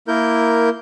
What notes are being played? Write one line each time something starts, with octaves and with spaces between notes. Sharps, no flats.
A#3 E4 A#4 G6